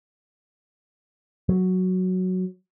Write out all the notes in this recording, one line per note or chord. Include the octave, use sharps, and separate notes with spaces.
F#3